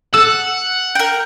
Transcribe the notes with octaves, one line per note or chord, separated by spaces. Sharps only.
A4 F#5 E6
A#4 G5